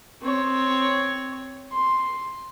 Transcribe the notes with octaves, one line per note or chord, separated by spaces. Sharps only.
C4 C#5
C6